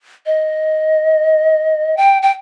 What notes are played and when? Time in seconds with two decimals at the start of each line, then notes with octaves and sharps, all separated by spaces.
0.26 D#5
1.97 G5
2.22 G5